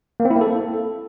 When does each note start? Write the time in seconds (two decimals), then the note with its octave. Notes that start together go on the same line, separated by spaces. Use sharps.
0.20 A#3
0.25 C4
0.30 E4
0.36 A#3
0.41 A4